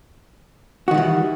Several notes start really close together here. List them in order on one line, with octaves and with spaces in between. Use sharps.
F#4 D#3 G3 E3